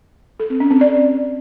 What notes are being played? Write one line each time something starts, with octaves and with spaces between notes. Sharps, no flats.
A4
C4
C#4
C4
D5